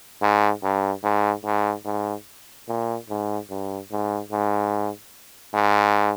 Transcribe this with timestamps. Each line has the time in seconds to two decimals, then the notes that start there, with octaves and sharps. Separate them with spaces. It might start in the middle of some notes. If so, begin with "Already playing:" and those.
0.22 G#2
0.63 G2
1.03 G#2
1.45 G#2
1.85 G#2
2.68 A#2
3.09 G#2
3.50 G2
3.91 G#2
4.32 G#2
5.54 G#2